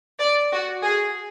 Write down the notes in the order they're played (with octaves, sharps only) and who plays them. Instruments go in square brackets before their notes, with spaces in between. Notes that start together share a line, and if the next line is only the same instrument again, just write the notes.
[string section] D5
F#4
G#4